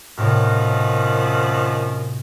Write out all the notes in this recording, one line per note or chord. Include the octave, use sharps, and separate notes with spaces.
F#2 A2 C3 D#3 F3